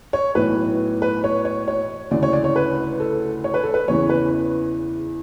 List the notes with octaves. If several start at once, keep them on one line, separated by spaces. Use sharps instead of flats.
C#5
B1 A2 E3 B4
B4
C#5
C#5
C#5
D2 C#3 E3 D5
C#5
D5
C#5
B4
A4
C#5
B4
A4
B4
E2 C#3 E3 C#5
B4